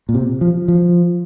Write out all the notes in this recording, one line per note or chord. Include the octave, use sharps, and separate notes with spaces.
A#2
C3
F3
F3